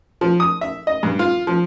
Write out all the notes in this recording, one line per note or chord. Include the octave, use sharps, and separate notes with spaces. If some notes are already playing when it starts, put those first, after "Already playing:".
F3
D#6
E5
D#5
G2
F4
F3